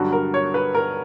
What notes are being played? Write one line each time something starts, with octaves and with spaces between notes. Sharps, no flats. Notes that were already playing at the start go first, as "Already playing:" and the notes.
Already playing: G2 D3 F#3 F#4
A#4
C#5
B4
A#4